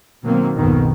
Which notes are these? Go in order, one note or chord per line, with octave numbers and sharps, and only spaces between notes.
B2 D#3 F#3 A#3 C4
B1 F2 G#2 B2 D#3